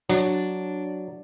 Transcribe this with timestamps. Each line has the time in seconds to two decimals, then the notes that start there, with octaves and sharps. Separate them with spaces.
0.09 F#3 D4